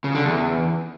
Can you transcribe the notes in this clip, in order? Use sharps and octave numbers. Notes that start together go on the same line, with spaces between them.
C#3
D3
E2